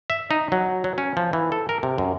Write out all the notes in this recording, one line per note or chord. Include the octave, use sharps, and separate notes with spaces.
E5
D#4
F#3
F#3
C#4
F3
E3
A4
A#4
C3
F#2